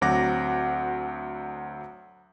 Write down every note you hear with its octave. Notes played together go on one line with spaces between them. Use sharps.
D2 F#3 C4 F#5 D6 A#6